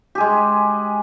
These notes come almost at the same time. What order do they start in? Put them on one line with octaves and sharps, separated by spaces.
G4 G#4 G#3